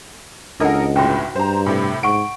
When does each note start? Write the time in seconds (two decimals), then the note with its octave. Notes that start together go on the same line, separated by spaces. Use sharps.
0.60 C#2 D4 D#4 A4 A#4 D#5 F#5
0.96 G1 A2 F#4 E5 G5
1.36 G2 C5 A#5
1.66 A2 C3 A3
2.03 G#2 F#5 C#6 D7